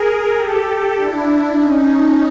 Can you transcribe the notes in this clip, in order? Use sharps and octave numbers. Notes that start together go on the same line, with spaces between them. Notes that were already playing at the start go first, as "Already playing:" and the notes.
Already playing: G#4 A#4
G4 A4
D4 E4
C#4 D#4